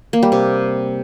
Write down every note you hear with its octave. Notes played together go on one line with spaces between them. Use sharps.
A#3
G3
C3